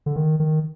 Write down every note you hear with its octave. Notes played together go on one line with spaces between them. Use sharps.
D3
D#3
D#3